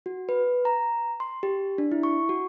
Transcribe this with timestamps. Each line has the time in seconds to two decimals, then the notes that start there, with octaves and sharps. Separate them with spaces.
0.06 F#4
0.29 B4
0.65 A#5
1.20 C6
1.43 G4
1.78 D4
1.92 E4
2.03 C#6
2.29 F#4